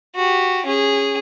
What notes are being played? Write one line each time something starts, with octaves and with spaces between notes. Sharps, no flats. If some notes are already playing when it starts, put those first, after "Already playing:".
F#4 G4
C#4 G#4